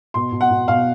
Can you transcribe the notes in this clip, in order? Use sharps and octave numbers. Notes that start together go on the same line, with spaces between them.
B2 C6
B2
F#5
B2
B2 F5